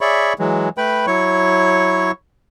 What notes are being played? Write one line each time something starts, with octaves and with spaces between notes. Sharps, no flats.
G#4 C#5 D5 E5 B5 C#6
E3 F#3 G#3
A3 B4 G5 B5
F#3 E4 C#5 C#6